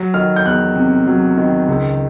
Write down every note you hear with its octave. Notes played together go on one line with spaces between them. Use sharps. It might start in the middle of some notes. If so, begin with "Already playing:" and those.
Already playing: F#3
D#3 F6
G6
E2 F#6
C3
F#3
D#3
C#2